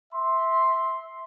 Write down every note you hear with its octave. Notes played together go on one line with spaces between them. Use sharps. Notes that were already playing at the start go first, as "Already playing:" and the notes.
E5 C6